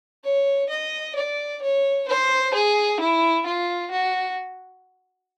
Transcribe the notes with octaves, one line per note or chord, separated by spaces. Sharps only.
C#5
D#5
D5
C#5
C5
G#4
E4
F4
F#4